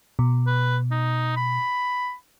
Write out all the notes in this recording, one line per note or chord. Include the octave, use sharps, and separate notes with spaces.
B2
B4
D#4
B5